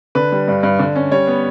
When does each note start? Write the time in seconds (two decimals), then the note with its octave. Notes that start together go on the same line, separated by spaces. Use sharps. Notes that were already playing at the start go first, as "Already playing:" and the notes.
0.15 D3 B4
0.32 G3
0.48 G2
0.63 G2
0.79 D3
0.96 C#4
1.12 G3 C#5
1.27 B3